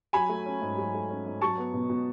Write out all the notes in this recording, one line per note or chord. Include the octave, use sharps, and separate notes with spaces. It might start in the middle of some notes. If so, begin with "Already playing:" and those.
F#3 G#5 B5
A3
C#4
G#2
F#3
A3
C#4
G#2
F#3 A5 C#6
B3
B2
B2